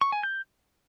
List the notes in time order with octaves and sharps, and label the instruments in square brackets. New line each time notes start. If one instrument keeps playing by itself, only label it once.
[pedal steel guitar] C#6
G#5
G6